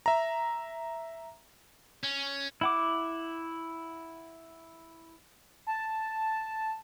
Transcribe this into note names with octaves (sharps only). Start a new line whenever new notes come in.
E5 A#5
C#4
E4 F#5 D6
A5